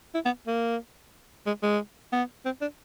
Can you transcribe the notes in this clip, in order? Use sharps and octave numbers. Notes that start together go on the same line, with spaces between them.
E4
B3
A#3
G#3
G#3
B3
C4
D4